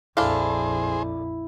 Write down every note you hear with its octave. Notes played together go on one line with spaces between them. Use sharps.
A#1 F2 D4 E4 G#4 A4 C5 F5